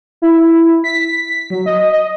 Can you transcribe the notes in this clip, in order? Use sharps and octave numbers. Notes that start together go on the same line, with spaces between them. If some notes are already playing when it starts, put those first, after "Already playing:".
E4
B6
F#3
D#5
D#5